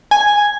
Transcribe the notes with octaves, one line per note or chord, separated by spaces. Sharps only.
G#5